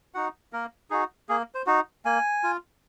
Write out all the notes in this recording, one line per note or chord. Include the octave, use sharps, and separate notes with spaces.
D#4 F#4 F#5
A#3 A#4
D#4 F#4 G#4
A#3 G#4
C5
D#4 F#4
A#3 G#5
F4